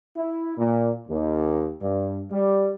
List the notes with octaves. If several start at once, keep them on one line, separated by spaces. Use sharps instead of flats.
E4
A#2
D#2
G2
G3